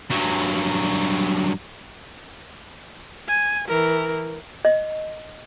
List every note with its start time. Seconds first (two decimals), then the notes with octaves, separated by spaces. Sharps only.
0.10 G2 F#3
3.28 G#5
3.68 E3 A#4
4.65 D#5